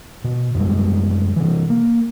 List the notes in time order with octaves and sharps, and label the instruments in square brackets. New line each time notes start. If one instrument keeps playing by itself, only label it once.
[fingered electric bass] B2
F#2 C3 G3 G#3
C3 E3
A#3